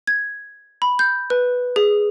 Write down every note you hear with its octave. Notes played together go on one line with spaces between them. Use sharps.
G#6
B5
G6
B4
G#4